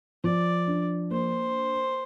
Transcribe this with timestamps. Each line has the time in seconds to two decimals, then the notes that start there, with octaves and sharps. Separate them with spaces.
0.24 F3 D5
0.67 D4
1.11 A#3 C5